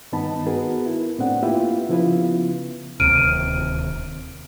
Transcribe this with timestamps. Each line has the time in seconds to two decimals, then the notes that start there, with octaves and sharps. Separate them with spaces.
0.12 G2 D#3 B3 D#4 A5 B5
0.46 B3 F#4 G#4 A#4 B4
0.86 E4
1.19 A2 B3 C4 D4 F#5
1.43 A#3 E4 F4 G4 B4 E5
1.89 C#3 F3 B3 E4 F4 B4
3.00 D1 D#2 C3 F6 D7 D#7